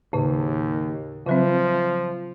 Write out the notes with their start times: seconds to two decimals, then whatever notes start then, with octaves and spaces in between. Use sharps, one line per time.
0.13 D#2 A2 C#3
1.27 C#3 F3 F#3 C4